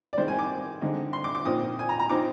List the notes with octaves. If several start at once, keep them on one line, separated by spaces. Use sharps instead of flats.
D5
C3 D#3 G#3 C5
G#5
D6
D3 G#3 C4 D#4
C6
D6
D6
A#2 F3 C4 D#4 D#6
G#5
A#5
A#5
F3 C4 D#4 D6